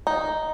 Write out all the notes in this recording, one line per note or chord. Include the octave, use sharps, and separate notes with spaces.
D#4